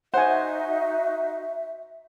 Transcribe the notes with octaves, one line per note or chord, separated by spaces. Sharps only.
D#4 F#4 C5 E5 F#5 G#5